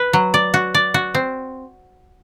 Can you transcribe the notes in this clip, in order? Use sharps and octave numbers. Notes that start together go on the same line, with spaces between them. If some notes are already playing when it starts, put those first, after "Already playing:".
Already playing: B4
F#3
D5
F#4
D5
F#4
C4